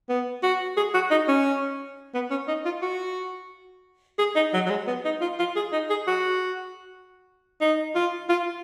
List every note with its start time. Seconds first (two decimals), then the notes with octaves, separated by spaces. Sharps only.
0.09 B3
0.43 F#4
0.77 G#4
0.94 F#4
1.11 D#4
1.28 C#4
2.14 B3
2.31 C#4
2.48 D#4
2.65 F4
2.82 F#4
4.19 G#4
4.36 D#4
4.53 F#3
4.66 F#3
4.70 G#3
4.87 B3
5.05 D#4
5.22 F4
5.39 F4
5.56 G#4
5.72 D#4
5.90 G#4
6.07 F#4
7.61 D#4
7.95 F4
8.29 F4